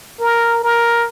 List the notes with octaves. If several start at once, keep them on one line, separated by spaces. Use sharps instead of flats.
A#4
A#4